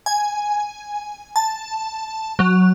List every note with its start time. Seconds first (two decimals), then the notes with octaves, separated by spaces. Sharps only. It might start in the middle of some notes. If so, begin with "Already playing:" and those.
0.06 G#5
1.36 A5
2.39 F#3